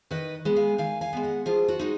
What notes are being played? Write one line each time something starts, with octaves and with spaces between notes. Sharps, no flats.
D#3 B4 D#5
G#3 B3
F5 G#5
D#3 F5 G#5
F5 G#5
G#3 B3
D#5 F#5
F3 F4 G#4
F#4
G#3 D#4